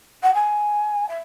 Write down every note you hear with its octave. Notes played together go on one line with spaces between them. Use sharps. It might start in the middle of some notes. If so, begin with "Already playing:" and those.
F#5
G#5
E5